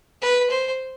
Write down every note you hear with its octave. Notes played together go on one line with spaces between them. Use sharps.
B4
C5